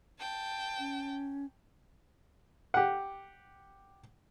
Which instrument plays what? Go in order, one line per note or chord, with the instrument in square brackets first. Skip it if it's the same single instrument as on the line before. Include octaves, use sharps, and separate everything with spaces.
[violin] G5 A5
[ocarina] C#4
[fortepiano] G4 F#5